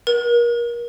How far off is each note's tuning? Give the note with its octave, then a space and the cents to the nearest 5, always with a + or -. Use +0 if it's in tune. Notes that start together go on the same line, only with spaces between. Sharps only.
A#4 +30